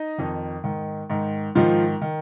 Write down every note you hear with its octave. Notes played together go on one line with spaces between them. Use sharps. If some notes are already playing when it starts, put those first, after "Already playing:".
Already playing: D#4 D#5
F2 D#3
G#2 D#3
G#2 D#3
G#2 D#3 F3 F4
D#3